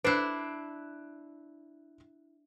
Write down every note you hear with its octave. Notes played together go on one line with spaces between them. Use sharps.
D4 E4 B4 C5 F#6 C7 D7